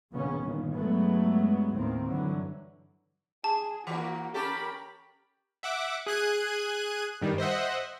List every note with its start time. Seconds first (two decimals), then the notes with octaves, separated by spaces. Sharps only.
0.12 A#1 D#2 C#3 B3 C#4
0.42 G1 A#2 D#3
0.74 G2 F#3 G#3 A3 B3
1.74 D#2 A2 D#3 C4
2.09 G2 D3 E3 F#3
3.44 G#4 A5
3.87 E3 A#3 F#4
4.34 C#4 G4 A4 A#4 B5
5.63 E5 F#5 D6
6.06 G#4 F#6 G#6 D#7
7.22 G2 D#3 G3
7.38 C5 D#5 E5 F#5